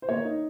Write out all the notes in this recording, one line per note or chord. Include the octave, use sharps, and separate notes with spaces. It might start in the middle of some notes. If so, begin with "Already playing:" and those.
C5
A#3 C#5
D#4